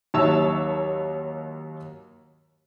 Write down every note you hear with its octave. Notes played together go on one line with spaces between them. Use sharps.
D#2 F#3 C#5 A5 E6